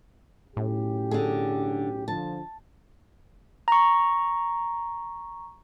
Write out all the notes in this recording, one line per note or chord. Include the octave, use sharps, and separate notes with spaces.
B1 A2 C#4 G4
D3 G#4
D3 F3 A5
A#5 C#6